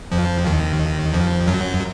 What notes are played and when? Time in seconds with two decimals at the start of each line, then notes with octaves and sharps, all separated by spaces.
0.12 F2 F3
0.46 D#2 D#3
1.14 F2 F3
1.47 F#2 F#3